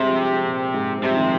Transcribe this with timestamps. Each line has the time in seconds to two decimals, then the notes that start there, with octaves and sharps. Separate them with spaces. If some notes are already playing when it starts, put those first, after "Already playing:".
Already playing: G2 C3 G3 G#3
0.08 F3
0.21 G3
0.33 G#3
0.45 A#2 A#3
0.74 G#2 G#3
1.02 C3 G3
1.10 F3
1.17 D#3
1.23 F3